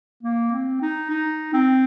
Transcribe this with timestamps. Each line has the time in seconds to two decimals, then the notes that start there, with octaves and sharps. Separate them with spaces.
0.23 A#3
0.52 C4
0.82 D#4
1.10 D#4
1.53 C4